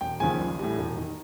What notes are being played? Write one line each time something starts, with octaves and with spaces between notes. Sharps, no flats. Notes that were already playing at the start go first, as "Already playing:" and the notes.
E1 G5
D#2 C#3 F3 G#3 G#5
A#1
A2 E3 G3
E1
D#3